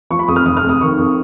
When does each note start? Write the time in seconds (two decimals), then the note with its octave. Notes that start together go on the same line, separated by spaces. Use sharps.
0.10 F3 C#6
0.19 B5
0.28 F2 D#6
0.36 F6
0.46 F1 D#6
0.57 F6
0.63 F2
0.69 D#6
0.81 D#3 C#6
0.98 F2